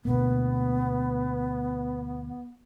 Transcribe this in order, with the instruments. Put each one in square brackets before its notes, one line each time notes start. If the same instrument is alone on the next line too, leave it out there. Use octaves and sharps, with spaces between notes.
[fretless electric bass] D2 B2 A#3 [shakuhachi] B3